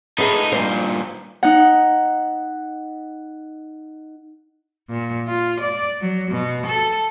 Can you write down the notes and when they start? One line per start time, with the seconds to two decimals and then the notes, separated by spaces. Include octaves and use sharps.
0.18 A3 D#4 G#4 A#4 B4
0.52 G2 A#2 C5
1.43 D#4 F#5
4.89 A#2
5.28 F4
5.60 D5
6.01 F#3
6.31 B2
6.66 A4